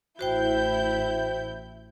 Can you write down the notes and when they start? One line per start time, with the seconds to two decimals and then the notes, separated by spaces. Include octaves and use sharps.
0.19 A1 E4 F#4 C5 G5 G6